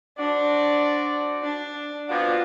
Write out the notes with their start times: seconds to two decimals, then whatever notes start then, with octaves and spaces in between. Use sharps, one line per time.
0.18 D4 F#4 C5 D5
1.43 D4
2.08 B2 C4 D4 F4 F#5